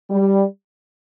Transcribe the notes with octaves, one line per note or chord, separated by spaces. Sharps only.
G3